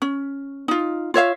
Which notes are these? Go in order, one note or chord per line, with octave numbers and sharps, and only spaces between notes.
C#4
D#4 F4
F4 C#5 E5 F5